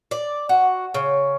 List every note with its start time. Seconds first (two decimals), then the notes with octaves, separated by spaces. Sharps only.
0.11 D5
0.49 F#4
0.94 C#3